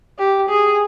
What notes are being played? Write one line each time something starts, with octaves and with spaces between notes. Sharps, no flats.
G4
G#4